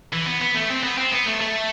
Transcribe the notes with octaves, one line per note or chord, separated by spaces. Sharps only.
E3
B3
B3
A3
C4
B3
C4
B3
A3
A3